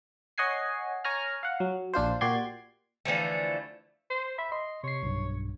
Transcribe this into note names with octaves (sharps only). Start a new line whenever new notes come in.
C#5 D#5 F#5 G#5 C7
C#5 G#5 A#5 F6
F5 F#5
F#3
A#1 D4 F4 C5
A#2 F#4 G4 D5 C6 G#6
D3 E3 F3 A3
C5
E5 B5
D#5 C6
C3 C#5 C7
B1 G2